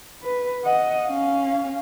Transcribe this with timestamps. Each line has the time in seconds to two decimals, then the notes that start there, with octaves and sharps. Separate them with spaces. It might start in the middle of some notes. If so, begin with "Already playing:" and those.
0.23 B4
0.64 D#5 F#5
1.08 C#4 F5